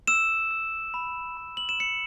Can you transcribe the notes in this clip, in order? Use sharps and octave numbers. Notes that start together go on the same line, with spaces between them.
E6 E7
E6
B5
B5
F#7
E7
E6 C#7